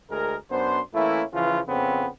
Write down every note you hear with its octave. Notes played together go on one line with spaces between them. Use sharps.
D2 G#3 G#4 A#4
F#2 B3 D4 C5
E3 A3 A#3 C#4 E4
C#3 E3 F3 E4 F4 B4
F2 C#3 B3 C4